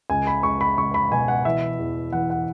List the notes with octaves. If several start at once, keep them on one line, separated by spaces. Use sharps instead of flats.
C#2 G#5
B5
C#2 C#6
B5
C#2 C#6
B5
B2 G#5
F#5
E3 E5
E2
E3 F#5
F#5